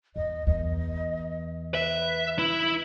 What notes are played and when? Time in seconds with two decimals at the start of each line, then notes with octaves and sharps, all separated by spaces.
0.16 E2 D#5
0.47 E2 D#5
1.75 B4 E5
2.39 E4